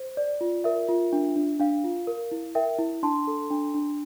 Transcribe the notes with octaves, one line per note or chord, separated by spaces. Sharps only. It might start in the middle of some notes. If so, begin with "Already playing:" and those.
Already playing: C5
D5
F4
A#4 E5
F4
D4
D4
D4 F5
F4
A#4
E4
A#4 E5 G5
E4
D4 A5 C6
A4
D4
D4